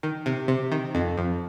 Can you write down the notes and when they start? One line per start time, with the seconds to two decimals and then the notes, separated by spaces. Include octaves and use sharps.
0.03 D#3
0.26 C3
0.48 C3
0.72 D#3
0.95 F2
1.18 F2